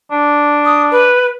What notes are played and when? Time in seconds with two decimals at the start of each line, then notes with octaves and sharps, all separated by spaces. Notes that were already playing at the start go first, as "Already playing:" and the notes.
0.11 D4
0.65 D#6
0.92 B4